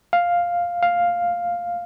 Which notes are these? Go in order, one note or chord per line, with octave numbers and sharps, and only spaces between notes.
F5
F5